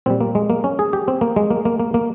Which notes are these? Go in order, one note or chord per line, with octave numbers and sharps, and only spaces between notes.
A#2 G3 C4
A#3
G#3
A#3
C#4
G#4
G4
C4
A#3
G#3
A#3
A#3
A#3
A#3